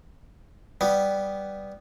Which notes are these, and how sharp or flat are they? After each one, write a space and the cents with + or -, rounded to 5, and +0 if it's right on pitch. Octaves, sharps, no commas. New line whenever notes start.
G3 +0 B3 +0